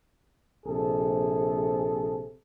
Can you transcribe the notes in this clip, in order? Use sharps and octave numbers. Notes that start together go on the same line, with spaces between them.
A#1 C3 G#4 A4